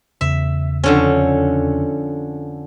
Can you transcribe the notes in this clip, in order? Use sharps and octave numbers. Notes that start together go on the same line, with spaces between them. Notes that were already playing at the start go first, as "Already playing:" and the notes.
E2 C#3 E5
F2 D3 C#4